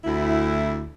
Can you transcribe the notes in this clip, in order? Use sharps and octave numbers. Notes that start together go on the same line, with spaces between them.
D2 E4